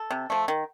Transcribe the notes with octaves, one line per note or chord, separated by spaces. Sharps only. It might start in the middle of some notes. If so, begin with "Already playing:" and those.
Already playing: A4
C3
F3 A3
D#3